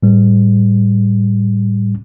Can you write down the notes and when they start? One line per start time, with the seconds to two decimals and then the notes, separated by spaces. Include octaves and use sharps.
0.03 A2 G3